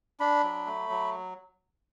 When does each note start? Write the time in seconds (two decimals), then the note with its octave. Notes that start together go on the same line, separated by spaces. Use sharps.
0.20 D4 B5
0.43 F#3
0.66 A3
0.90 F#3